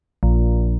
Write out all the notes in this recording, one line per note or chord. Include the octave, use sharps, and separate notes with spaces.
A#1